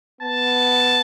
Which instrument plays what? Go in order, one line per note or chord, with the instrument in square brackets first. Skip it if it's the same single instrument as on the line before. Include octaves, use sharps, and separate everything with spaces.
[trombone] B3 [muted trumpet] A5